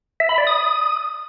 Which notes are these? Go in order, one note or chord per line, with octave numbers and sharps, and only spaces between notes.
E5
B5
D5
D#6